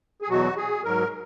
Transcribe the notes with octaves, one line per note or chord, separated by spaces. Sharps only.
G#4
E2 B2 F#3 F#4
G#4
G#2 F#3 A#4